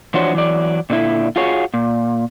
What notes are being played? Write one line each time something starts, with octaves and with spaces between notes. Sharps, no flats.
E3 F3 D4 F#4 C5 C#5
E3 F#3 D5
A#2 D3 E4
F4 F#4 G#4 C#5
A#2